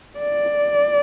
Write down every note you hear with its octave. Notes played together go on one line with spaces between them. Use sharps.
D5